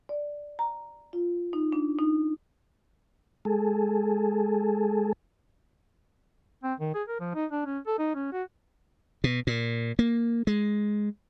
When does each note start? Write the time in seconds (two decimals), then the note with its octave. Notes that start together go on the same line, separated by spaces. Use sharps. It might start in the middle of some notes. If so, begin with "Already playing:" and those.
0.09 D5
0.59 A#5
1.13 F4
1.53 D#4
1.72 D4
1.99 D#4
3.45 G#3 G#4 A4
6.64 C4
6.80 D#3
6.95 G#4
7.08 A#4
7.20 F3
7.35 D#4
7.52 D4
7.66 C#4
7.87 A4
7.99 D#4
8.15 C#4
8.33 F#4
9.24 B2
9.47 A#2
9.99 A#3
10.47 G#3